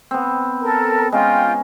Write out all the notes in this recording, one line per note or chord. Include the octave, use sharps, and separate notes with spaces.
B3 C4
A4 A#4
G#3 C#4 F4 G5